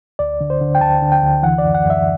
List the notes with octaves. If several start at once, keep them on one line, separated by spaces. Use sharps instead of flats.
D2 D5
D3
C5
D3
G5
D2 A5
D3
G5
D2
E3 F#5
D5
F#2
F#5
F#2 E5